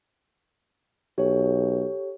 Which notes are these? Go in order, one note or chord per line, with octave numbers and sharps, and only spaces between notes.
B1 G4 A4 C#5